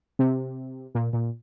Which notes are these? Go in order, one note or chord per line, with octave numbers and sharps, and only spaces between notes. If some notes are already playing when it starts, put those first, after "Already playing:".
C3
A#2
A#2